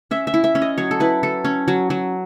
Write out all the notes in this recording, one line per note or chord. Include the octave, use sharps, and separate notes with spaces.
C#4 E5
E5
E4
E5
C#4
D#5
F#3 C#5
A4
E4 B4
F#3 A4
C#4
F#3
F#3